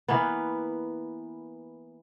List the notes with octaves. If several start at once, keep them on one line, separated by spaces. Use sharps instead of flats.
E3 A#3 B3